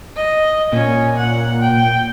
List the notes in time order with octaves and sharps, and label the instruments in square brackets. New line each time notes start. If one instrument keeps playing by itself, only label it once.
[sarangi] D#5
[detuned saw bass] A#2 [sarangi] C#4
[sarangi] F#5
G5